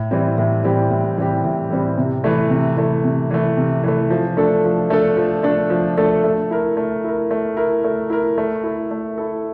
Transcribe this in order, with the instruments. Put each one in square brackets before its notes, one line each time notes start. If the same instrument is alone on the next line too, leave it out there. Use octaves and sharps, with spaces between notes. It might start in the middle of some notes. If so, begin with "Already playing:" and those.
Already playing: [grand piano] A2
E3 G3 C4 G4
A2
E3 G3 C4 G4
A2
E3 G3 C4 G4
A2
E3 G3 C4 G4
C3
E3 A3
C3
E3 A3
C3
E3 A3
C3
E3 A3
F3
A3 D4 A4
F3
A3 D4 A4
F3
A3 D4 A4
F3
A3 D4 A4
A3
E4 A#4
A3
E4 A#4
A3
E4 A#4
A3
E4 A#4
A3
E4 A4
A3
E4 A4